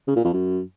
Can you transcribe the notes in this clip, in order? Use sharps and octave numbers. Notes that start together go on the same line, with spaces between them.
C#3
A#2
F2
F#2